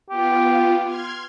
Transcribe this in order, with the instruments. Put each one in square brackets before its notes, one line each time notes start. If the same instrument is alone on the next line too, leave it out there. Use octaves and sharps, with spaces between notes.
[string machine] B3 F4 [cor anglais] G4
[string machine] C6 F6 G#6